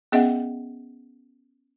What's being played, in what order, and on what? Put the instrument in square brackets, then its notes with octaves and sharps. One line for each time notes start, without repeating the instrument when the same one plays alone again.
[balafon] B3 C#4 G#4 D#5 E5 F#5